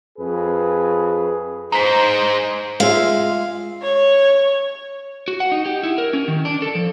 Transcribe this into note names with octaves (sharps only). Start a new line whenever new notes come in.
F2 G#4 B4
G#3 D#4 C5 A#5 B6
G#3 F4 E5 F5
C#5
F#4
F#5
D#4
G4
E4
A#4
C#4
D#3
D4
A4
F3